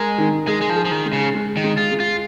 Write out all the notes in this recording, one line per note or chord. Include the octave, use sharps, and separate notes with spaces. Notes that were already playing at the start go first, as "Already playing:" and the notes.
Already playing: G#3 A#4
D#3
G#3 G#4
G#3
F3
G#4
F3
D#3
G#3
C#3
G#3
D#3
G#3
F4
G#3
F4